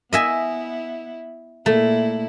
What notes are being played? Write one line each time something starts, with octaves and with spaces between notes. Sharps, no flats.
B3 E4 D#5 E5 G#5
A#2 A3 E4